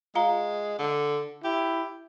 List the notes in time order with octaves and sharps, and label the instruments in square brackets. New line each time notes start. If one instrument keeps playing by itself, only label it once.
[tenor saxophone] G#3 [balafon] F4 F5 A#5
[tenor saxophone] D3
[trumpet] E4 [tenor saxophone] G4